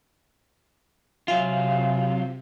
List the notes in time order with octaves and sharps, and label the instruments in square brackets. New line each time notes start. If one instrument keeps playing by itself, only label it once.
[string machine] C3 [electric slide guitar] F#3 F4 [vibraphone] E5 F5 G#5